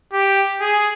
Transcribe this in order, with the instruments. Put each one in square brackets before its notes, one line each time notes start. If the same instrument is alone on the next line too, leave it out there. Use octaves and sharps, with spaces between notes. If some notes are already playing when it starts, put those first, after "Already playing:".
[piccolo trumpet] G4
G#4